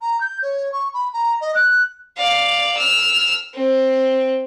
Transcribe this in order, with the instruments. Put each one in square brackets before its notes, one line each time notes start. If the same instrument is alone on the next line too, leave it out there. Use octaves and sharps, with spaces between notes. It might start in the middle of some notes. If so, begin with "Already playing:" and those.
[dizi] A#5
G6
C#5
C#6
B5
A#5
D#5
F#6
[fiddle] D5 F5
E6 F6
C4